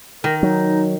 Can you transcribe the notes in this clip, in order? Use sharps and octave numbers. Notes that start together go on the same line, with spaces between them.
D#3 A#4
F#3 D#4